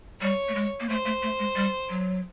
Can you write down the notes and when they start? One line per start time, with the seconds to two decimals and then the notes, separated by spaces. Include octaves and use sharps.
0.21 G3 C#5
0.48 A3
0.55 G#3
0.80 A#3
0.89 A3 C5
1.05 A3
1.22 A3
1.39 G#3
1.56 G3
1.90 F#3